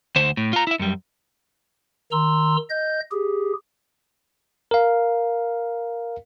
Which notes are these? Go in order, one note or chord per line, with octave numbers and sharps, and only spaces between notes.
D2 C5
A2
F4 A#5
E4 E5
F#2 G3
D#3 A#5 C6 E6
D#5 G6
G4 G#4
A#4 F5